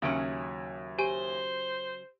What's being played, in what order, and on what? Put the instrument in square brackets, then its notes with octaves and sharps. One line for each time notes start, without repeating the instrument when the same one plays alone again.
[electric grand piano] D#2 E5 D7 [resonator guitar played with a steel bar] C#3 F#3 C#4
[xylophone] G4 G#5 D#7 [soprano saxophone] C5